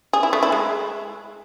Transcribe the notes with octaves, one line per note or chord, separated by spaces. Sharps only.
G#4
E4
A3
E4
G#3